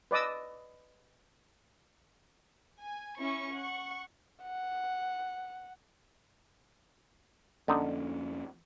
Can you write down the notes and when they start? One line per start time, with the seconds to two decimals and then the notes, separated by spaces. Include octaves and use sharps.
0.11 B4 D5 D#5 D#6 E6
2.80 G#5
3.18 C#4 E4 C#6
3.54 F#5 C#6
4.43 F#5
7.68 F2 D3 A#3 C#4 D#4